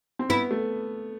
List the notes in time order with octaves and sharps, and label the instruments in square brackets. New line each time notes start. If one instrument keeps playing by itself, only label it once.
[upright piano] C4
[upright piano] B3 [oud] E4
[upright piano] A3